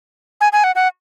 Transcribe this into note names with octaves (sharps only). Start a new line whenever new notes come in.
G#5
G#5
F#5
F#5